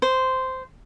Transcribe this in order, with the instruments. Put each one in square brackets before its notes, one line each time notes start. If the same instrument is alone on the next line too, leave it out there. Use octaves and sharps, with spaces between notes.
[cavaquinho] C5